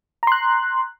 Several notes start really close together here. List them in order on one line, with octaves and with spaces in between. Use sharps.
A#5 C6 F#6